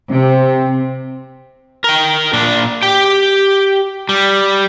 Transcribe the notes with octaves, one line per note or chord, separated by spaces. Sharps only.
C3 C4
A#4 G5
A#2 D4
G4 G5
G3